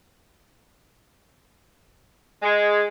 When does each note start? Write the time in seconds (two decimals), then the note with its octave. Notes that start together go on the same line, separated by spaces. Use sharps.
2.43 G#3